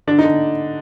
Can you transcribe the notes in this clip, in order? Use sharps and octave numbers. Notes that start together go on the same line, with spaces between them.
D3 D4
D#4
D3